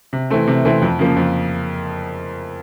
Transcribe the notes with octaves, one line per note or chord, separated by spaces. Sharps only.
C3
E3 A3 C4
C3
E3 A3 C4
F2
C#3 F3 A#3
F2